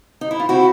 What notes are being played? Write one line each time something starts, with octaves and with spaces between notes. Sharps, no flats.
D#4
E4
F4
C4 E4 F#4